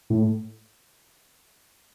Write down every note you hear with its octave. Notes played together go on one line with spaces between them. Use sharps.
A2